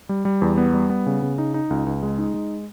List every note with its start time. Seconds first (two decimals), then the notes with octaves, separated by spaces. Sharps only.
0.09 G3
0.25 G3
0.42 E2
0.57 B3
0.74 G3
0.90 B3
1.06 C#3
1.22 C#3
1.38 D#4
1.54 D#4
1.70 C#2
1.86 C#2
2.03 G#3
2.18 D#4
2.34 G#3